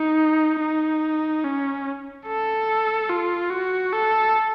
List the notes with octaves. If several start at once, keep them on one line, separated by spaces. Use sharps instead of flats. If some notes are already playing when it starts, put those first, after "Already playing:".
Already playing: D#4
D#4
C#4
A4
F4
F#4
A4